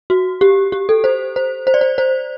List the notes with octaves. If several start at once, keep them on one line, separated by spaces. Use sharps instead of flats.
F#4
G4
G4
A4
C5
C5
C5
D5
C5
C5